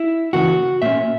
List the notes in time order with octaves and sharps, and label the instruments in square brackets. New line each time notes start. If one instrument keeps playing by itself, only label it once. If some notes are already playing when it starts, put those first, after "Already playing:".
Already playing: [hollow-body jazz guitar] E4
C#3 E3 A#3 F#4
A#2 A#3 C#4 E5